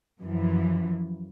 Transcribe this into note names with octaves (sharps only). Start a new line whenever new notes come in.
F#2 E3 F3